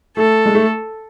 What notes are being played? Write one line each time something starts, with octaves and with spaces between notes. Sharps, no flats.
A3 A4
G#3
A3